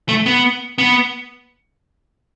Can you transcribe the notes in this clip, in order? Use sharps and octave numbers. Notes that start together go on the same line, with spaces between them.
A3
B3
B3